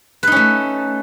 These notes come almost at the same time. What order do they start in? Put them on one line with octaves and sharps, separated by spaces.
B4 D#4 C#4 A3